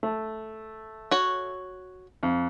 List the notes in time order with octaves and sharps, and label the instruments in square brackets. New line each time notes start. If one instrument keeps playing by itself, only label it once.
[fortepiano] A3
[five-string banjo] F#4 C#5
[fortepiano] F2